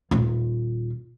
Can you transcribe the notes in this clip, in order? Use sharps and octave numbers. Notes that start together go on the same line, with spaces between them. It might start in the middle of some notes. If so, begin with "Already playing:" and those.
D#1 F4